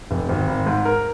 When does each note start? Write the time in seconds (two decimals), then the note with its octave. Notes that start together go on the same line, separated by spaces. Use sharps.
0.11 F1
0.29 G#1
0.48 G#1
0.66 G#2
0.85 A#4